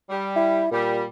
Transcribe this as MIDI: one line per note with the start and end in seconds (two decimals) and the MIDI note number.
0.10 0.63 55
0.36 0.71 64
0.71 1.05 46
0.71 1.02 55